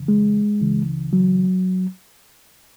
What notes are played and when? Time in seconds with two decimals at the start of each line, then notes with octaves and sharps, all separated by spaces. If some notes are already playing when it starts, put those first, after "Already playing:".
Already playing: F2 C#3 E3
0.08 G#3
0.61 C#2 C#3 E3
1.13 F#3